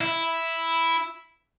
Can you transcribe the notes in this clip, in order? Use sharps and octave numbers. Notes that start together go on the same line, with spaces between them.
E4